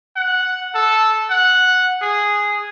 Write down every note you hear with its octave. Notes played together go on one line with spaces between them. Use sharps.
F#5
A4
F#5
G#4